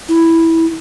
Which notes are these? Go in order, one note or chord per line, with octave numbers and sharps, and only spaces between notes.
E4